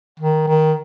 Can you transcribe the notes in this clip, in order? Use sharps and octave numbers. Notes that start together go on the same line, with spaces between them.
D#3
D#3